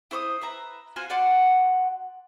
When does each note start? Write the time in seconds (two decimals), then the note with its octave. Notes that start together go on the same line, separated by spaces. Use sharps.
0.11 E4 C5 C#6 D#6
0.42 B4 E5 A#5
0.96 F4 F#4 C5 G#5
1.10 F#4 D5 F#5 C6